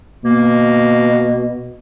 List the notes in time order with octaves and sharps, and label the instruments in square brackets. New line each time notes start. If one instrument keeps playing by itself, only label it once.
[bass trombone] B2 [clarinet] A#3